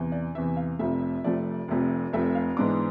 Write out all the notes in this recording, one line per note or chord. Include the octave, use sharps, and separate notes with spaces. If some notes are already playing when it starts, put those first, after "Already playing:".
Already playing: E2 C3 E3
D5
E2 C3 E3 E5
F5
F1 F2 C3 F3 A3 E5
F1 F2 C3 F3 A3 D5
F1 F2 C3 F3 A3
F1 F2 C3 F3 A3 E5
F5
G#2 E3 G#3 B3 D4 D6